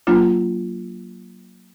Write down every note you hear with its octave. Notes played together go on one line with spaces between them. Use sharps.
F#3 A#3 D4 F4